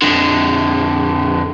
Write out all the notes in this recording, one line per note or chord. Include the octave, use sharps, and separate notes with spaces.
F2 D3